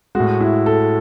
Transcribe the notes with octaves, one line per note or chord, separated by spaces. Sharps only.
A2 G#3 F#4
E4
A4